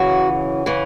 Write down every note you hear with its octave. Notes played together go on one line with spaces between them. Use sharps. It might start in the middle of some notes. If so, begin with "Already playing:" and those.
Already playing: F#2 C#3 E3 F#4
C#3 E3